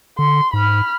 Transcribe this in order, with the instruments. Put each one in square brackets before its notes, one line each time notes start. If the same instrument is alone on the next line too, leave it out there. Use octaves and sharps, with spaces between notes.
[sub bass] D3 [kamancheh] C6
[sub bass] G#2 [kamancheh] B5 F6